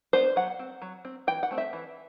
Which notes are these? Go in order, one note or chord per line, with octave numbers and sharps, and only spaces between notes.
B3 D4 C5
F#3 F#5
C4
F#3
C4
E3 G5
F#5
A3 C4
E5
E3